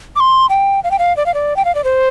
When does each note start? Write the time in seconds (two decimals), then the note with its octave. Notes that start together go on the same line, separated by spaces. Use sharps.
0.16 D6
0.20 C6
0.50 G5
0.84 F5
0.91 G5
0.99 F5
1.17 D5
1.26 F5
1.34 D5
1.57 G5
1.65 F5
1.75 D5
1.84 C5